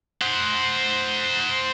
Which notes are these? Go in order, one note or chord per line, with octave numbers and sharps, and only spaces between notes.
C5 F#5